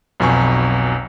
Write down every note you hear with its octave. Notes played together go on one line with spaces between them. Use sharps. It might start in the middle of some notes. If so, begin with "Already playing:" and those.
B1 F2 B2 G#5 A#5 C#6